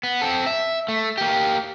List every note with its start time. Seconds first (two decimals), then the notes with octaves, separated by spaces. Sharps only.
0.03 B3
0.22 C4 A4
0.46 E5
0.88 A3
1.18 A#3 G4